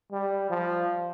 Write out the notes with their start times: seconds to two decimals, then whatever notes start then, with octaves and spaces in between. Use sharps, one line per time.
0.12 G3
0.50 F3